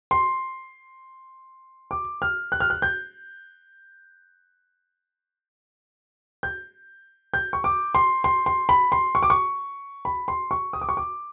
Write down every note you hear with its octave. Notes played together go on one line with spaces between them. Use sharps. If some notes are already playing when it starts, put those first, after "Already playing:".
C6
D6
F6
F#6
F6
F#6
G6
G6
G6
C#6
D6
C6
C6
C6
B5
C6
C#6
D6
C#6
B5
C6
C#6
D#6
D6
C#6
D6